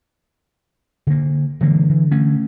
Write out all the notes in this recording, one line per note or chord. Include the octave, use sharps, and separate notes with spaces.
D3 A#3
D3 E3 G#3 A#3
E3
A3 C#4